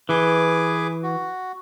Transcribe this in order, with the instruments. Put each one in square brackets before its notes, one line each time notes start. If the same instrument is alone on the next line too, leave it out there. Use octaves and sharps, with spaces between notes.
[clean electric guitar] E3 [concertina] G#4 B4 D6
[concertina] F#4